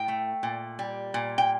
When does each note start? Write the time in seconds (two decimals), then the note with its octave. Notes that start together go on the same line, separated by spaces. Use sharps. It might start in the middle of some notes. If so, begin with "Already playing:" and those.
Already playing: A2 G5
0.08 A3
0.43 A#2
0.79 G3
1.14 A#2
1.38 G5